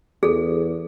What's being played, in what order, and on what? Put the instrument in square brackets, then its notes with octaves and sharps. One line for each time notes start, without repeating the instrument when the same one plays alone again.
[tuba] E2 [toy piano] G#4 A4